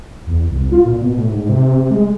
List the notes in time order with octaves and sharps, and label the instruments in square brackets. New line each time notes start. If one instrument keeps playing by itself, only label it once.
[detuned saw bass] E2
C2
F4
A#2
B2
A2
G#2
C3
C3
G#3